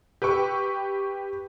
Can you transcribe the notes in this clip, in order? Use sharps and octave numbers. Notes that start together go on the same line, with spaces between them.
G4 B4 G5 C#6 E6